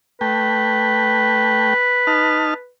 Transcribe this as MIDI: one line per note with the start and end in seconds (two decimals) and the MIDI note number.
0.21 1.74 57
0.21 2.70 71
0.21 1.74 79
2.07 2.54 63
2.07 2.54 81
2.07 2.54 89